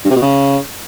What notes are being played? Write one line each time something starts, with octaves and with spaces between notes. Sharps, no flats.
G2
C3
B2
C#3